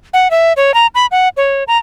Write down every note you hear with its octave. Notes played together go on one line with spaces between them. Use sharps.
F#5
E5
C#5
A#5
B5
F#5
C#5
A#5